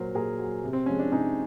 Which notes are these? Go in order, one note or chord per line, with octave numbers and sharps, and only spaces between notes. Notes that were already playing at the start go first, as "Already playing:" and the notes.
Already playing: A#2 F#3 A#4 C5
A#2 G#4 A#4
F#3
C3
C4
F3 G#3 C#4
D4
C3 C#4 D#4